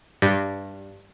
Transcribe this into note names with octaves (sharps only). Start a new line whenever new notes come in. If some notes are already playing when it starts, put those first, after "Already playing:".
G2